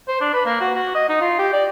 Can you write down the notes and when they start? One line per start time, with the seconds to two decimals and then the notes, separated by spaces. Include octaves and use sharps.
0.08 C5
0.21 D4
0.34 B4
0.46 A#3
0.61 F#4
0.75 F#4
0.95 D#5
1.09 D#4
1.21 F4
1.39 G4
1.53 D5